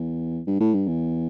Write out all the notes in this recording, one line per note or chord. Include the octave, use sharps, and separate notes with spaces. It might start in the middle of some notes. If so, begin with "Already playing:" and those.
Already playing: E2
G2
A2
G2
E2